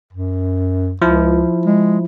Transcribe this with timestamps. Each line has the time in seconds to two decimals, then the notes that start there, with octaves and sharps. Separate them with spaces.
0.13 F#2
1.02 C#2 F3 E4
1.65 G#3